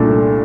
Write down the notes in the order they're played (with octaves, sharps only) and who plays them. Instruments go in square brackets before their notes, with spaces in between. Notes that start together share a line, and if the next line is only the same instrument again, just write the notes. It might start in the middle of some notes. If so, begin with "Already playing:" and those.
Already playing: [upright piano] C2 A#2 A3 D4